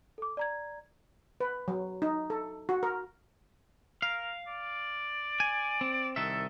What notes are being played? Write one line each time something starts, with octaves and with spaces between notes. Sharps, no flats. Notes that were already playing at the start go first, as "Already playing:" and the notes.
A4 D6
D5 A#5 G#6
B4
F#3
D#4
A4
F#4
A#4
A#4 F5
D5
G#5
C4
C2 D#3 A4 E5